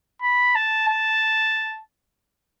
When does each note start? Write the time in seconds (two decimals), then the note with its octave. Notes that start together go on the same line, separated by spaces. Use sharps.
0.22 B5
0.55 A5
0.89 A5